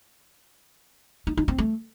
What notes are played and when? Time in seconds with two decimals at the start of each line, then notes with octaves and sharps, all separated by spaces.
1.27 D#4
1.37 D#4
1.48 C4
1.58 A3